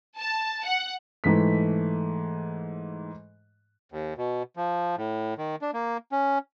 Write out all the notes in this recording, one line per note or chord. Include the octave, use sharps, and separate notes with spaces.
A5
F#5
G#2 E3 A3 B6
D#2
B2
F3
A2
D#3
D4
A#3
C#4